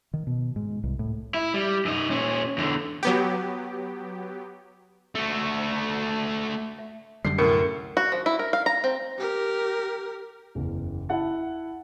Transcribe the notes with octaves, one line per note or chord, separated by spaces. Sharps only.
D#3
B2
G#2
C2
A2
E4
G3
F#2 D#4
A#2 C#4
E2 D3
F#3 B3 G4
A3 F#4
E5
F#2 D3 G3 C7
C2 A2 C#4 A#4 C#7
F#4
F3
E4
A#4
F5
A#5
C4
G4 A#4
F#1 E2
E4 F#5 A5